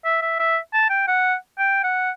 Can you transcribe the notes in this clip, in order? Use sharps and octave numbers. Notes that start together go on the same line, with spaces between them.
E5
E5
E5
A5
G5
F#5
G5
F#5